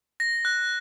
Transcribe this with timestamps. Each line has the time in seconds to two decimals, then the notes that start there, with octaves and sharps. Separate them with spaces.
0.20 A#6
0.45 F#6